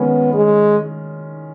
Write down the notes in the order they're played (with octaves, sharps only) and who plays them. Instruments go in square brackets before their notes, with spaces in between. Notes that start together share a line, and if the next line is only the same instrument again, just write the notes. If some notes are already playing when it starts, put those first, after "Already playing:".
Already playing: [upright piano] D#3 G#3 C#4 [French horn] B3
[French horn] G#3